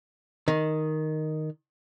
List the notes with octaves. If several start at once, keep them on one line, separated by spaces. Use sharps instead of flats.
D#3